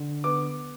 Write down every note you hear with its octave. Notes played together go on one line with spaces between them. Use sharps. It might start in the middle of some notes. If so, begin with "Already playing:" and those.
Already playing: D3
B3 D6